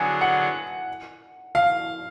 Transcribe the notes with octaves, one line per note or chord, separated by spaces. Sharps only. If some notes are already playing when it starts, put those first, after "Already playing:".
Already playing: D3 F#3 B3 D4 G#4 G#5
F#5
F5